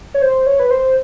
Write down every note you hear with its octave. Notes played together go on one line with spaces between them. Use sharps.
C#5
C5
C#5
B4
C5